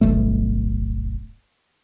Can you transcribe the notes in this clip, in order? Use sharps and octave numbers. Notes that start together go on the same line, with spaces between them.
D1 G1 B2 A3